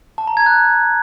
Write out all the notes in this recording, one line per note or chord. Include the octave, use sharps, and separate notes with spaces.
A5
A#5
G#6
F#6